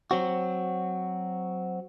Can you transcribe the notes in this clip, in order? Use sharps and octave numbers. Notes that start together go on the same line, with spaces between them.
F#3 C4 F#4